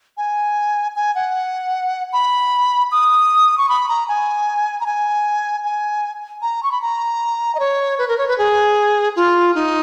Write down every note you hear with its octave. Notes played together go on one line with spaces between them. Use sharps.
G#5
G#5
F#5
B5
D#6
C#6
B5
A#5
G#5
A#5
G#5
G#5
A#5
C#6
B5
A#5
D#5
C#5
B4
A#4
C#5
B4
G#4
F4
D#4